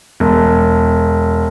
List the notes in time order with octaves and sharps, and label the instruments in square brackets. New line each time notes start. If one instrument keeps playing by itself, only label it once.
[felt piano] E1